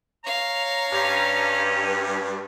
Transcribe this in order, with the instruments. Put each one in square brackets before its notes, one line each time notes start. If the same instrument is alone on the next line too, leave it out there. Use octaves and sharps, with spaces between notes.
[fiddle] C#5 F5 [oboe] A#5
[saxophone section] G2 [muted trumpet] C#4